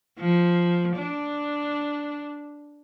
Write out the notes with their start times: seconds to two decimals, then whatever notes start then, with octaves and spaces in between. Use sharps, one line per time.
0.19 F3
0.97 D4